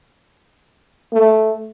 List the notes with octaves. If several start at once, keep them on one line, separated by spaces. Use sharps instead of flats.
A3